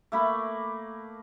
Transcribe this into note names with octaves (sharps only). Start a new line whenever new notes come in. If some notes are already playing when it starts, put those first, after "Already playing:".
A3 A#3 B5